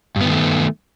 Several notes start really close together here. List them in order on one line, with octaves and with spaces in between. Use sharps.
G2 B3 D#3 A3